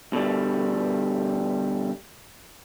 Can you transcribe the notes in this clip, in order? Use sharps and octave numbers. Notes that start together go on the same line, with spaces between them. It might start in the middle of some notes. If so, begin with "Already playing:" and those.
B2 D3 G3